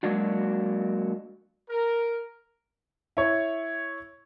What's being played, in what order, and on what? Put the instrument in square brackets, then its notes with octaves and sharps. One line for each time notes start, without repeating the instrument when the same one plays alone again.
[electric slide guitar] F#3 G#3 A#3 D4 F#4
[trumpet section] A#4
[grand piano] E4 C#5